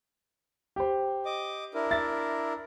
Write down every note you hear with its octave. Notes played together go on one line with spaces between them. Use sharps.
G4 C5
D#5 D6
D4 E4 A#4
E5 A6